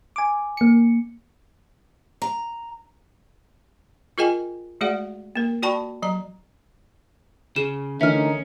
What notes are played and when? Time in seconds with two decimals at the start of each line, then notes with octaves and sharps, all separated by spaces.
0.16 G#5 D6
0.57 A#3 C#7
2.22 A#5
4.18 F4 G#4 A#4 D#5 G5 G#5
4.81 G#3 A3 F#4 G#4 D5 F#5
5.36 A#3 A#4
5.62 F#4 D5 G5 A5 B5 C#6
6.02 F#3 D#5 A#5
7.56 C#3 G#4 E7
8.01 D3 E3 A3 C#4 D#4 A#4 E5 F6